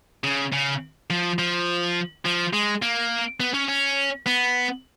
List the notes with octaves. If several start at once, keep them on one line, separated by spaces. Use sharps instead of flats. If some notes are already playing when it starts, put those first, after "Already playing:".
C#3
C#3
F3
F3
F3
G#3
A#3
B3
C#4
C#4
B3